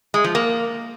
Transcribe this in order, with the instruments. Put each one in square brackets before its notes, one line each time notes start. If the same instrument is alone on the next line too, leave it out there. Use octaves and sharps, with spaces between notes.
[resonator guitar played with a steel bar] G#3
F3
A#3